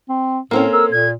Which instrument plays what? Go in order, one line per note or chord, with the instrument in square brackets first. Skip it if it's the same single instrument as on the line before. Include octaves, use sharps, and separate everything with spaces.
[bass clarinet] C4
[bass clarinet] A2 [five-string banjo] A#3 C4 C#4 [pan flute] A4
[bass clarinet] A#4 [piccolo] E6
[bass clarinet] A#2 [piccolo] G#6